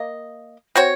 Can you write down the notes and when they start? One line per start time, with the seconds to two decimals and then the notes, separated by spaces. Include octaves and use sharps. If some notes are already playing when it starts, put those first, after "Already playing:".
Already playing: A#3 D#5
0.76 C4 F#4 C#5